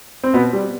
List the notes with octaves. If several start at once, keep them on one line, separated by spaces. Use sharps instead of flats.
C4
B2 B3
G3